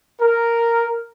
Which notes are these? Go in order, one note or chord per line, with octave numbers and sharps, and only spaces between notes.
A#4